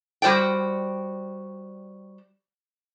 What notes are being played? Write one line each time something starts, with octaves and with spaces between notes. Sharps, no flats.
G3 F#4 C5 D5 G5